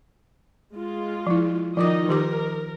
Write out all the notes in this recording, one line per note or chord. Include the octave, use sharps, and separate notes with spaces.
G#3 F4
F3 E4
D#3 F3 D#4 F4 D#5 D6
D#3 G4 A#4 D6